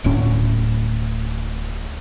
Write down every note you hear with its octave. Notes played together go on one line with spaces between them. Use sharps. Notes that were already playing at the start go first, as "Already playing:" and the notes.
D1 D2 A2 C#4